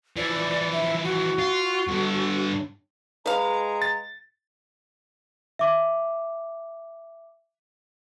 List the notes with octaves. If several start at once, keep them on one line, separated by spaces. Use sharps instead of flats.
E3 F3 D5
E5
F#4
F4
G2 D3
G#3 B4 F5 A#5
A6
E5 D6